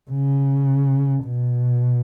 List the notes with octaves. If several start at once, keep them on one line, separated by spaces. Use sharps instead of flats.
C#3
B2